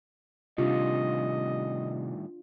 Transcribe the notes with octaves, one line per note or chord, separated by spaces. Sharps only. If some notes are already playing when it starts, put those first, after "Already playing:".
A2 C3 D#3 G3 D4 F4 D#5